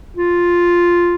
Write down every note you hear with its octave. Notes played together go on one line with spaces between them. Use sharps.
F4